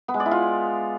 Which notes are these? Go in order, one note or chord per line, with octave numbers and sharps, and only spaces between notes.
B3
G#3
D5
E4
F4